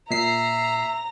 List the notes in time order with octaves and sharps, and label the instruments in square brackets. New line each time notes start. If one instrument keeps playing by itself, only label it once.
[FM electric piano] A#2 C7 [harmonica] E5 [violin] A#5